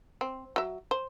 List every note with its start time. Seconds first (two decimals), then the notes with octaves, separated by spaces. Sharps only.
0.21 C4
0.56 F#3 E5
0.91 C5